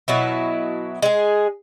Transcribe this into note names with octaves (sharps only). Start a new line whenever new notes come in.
B2 F#3 E4
G#3 G#4